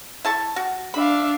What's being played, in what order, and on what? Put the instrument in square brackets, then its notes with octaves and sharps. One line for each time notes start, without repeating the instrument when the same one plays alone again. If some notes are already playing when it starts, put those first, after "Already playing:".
[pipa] E4 A5 C#6
F#4
[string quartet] D4 E5 F5 [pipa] B5